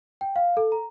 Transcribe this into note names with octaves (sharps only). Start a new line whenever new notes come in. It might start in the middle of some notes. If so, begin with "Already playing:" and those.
G5
F5
A4
A#5